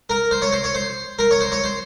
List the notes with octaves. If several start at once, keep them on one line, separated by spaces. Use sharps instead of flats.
A#4
C5
C#5
C5
C#5
C5
A#4
C#5
C5
C#5
C5